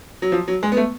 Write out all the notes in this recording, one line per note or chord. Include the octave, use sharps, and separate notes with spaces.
F#3
F3
F#3
G#3
B3
A3